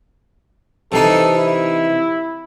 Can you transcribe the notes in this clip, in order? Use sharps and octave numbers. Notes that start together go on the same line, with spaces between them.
C3 E3 D#4 A4
E4